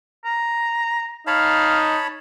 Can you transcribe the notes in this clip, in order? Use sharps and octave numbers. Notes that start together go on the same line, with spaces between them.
A#5
D#4 C#5 F5 A5 B5